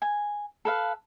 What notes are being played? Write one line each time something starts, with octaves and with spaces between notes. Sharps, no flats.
G#5
A4 B4 F5